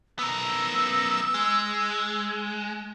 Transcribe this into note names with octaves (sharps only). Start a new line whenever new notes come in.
B3 A#4 E6
G#3